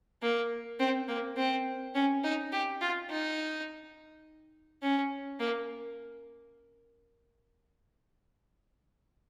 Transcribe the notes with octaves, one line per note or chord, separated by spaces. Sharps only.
A#3
C4
A#3
C4
C#4
D#4
G4
F4
D#4
C#4
A#3